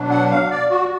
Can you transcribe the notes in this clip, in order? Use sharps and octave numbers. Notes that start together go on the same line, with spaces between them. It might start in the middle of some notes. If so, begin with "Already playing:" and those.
Already playing: B2 F#3 D4
F#5
F5
D5
F#4